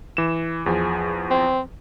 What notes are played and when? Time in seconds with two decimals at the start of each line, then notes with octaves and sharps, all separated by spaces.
0.17 E3 E7
0.66 E2 F3 G#4
1.30 C4